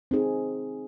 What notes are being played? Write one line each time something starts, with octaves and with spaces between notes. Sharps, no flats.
C4 D#4 G#4